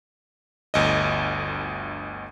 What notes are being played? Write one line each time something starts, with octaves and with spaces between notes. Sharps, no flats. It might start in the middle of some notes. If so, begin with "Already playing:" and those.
G1 D2 D#5